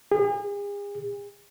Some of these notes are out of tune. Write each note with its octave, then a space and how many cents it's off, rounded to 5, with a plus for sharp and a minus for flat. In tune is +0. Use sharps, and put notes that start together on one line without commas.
G#4 -40